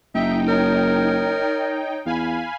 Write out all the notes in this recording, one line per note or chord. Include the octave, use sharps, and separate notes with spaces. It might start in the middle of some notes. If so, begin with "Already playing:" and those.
F#1 D#4 E5 G5
A#4 C#5
E2 F5 G#5 B5